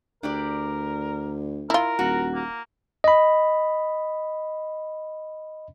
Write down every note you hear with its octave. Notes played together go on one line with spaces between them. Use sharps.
D2 D4 G4 A#4 D5
E4 F4 A#4
D#1 F#4
A#3
D#5 B5